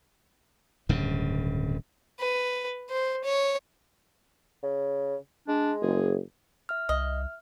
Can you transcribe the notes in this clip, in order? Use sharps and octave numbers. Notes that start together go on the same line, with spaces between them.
D1 G2 C#3
B4
C5
C#5
C#3
G#3 D4
F#1 G#4
E5 F6
C2 D#5